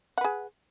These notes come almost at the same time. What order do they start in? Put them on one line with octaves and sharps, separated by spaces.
F#5 B4 G#4